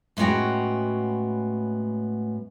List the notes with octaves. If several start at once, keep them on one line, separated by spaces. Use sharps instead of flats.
A2 G#3 B3 C#4 F#4 G5